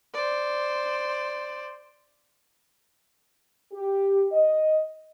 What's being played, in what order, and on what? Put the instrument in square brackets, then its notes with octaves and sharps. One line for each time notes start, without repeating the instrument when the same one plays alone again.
[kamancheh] C5 D5
[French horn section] G4
D#5